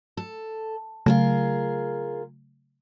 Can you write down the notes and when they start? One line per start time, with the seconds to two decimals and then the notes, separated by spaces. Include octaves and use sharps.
0.17 A4
1.06 C#3 F#3 A3 F4 G#4 A#4